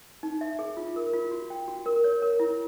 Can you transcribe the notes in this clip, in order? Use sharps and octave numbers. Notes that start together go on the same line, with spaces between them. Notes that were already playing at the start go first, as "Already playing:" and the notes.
D#4
E5
G#4
F4
A#4
F4
F#4
G5
F#4
A#4
C#5
A#4
E4